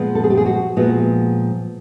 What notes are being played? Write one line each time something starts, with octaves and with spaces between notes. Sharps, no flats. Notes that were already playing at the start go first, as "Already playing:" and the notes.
Already playing: A#2 F3 G#3 B3
A4
G#4
G4
G#4
F#4
A#2 F3 G#3 B3 F#4